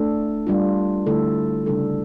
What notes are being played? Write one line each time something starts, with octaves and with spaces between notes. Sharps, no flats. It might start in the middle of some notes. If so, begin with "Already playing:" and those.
Already playing: A3 D4 A4
G3 D4 F4
D3 A3 E4 A4
C#3 G3 D4 A4